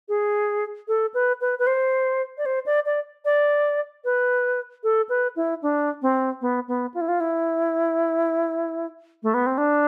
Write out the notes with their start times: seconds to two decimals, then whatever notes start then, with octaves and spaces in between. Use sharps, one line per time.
0.09 G#4
0.88 A4
1.14 B4
1.41 B4
1.59 B4
1.67 C5
2.38 D5
2.45 C5
2.66 D5
2.86 D5
3.25 D5
4.05 B4
4.83 A4
5.09 B4
5.36 E4
5.62 D4
6.02 C4
6.41 B3
6.68 B3
6.94 F4
7.01 E4
7.08 F4
7.20 E4
9.23 A3
9.34 B3
9.46 C4
9.58 D4